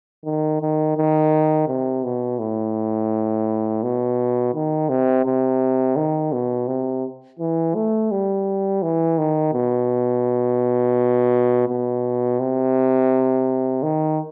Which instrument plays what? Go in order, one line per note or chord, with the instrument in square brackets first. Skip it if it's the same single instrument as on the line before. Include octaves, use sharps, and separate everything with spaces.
[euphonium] D#3
D#3
D#3
C3
B2
A2
B2
D#3
C3
C3
D#3
B2
C3
E3
A3
G3
E3
D#3
B2
B2
C3
D#3